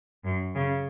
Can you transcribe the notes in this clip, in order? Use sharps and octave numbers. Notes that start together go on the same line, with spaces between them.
F#2
C#3